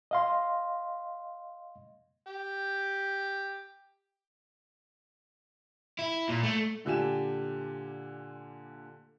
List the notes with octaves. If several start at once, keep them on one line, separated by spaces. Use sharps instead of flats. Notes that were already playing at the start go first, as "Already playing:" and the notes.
D#5 F5 C6
G4
E4
A#2
A3
A#2 D3 G4 G#5 E7